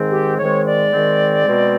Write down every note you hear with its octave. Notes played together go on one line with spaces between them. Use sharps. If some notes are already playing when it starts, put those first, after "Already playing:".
Already playing: G#2 D#3 G#3 C4
G4
G#2 D#3 G#3 C4 C#5
D5
G#2 D#3 G#3 C4
B2 G#3 C4